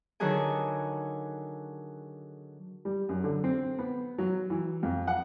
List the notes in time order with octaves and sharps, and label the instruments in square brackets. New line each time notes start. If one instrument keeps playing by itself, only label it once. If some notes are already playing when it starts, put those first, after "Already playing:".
[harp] D3 D#3 F#3 F#4 G#4 G#5
[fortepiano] G3
F#2
D3
C4
B3
F#3
E3
F2
F#5